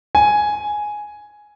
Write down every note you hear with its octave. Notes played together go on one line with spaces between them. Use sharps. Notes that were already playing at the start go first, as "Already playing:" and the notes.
G#5